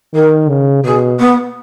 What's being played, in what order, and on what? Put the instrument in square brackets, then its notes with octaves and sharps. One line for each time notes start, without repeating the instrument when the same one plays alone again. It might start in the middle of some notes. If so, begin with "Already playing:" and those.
[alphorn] D#3 [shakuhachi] A#4
[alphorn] C#3
[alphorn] B2 [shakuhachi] G#4
[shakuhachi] B3